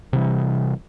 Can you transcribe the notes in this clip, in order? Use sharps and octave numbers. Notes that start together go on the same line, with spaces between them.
C3 E3 G3